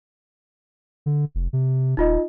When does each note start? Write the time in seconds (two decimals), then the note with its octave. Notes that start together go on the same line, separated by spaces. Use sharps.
1.06 D3
1.35 F1
1.53 C3
1.97 D#1 D#4 F4 D#5